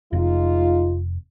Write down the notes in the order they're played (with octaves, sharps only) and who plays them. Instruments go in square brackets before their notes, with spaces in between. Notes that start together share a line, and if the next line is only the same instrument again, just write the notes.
[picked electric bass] F1 [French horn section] G#3 D#4 F4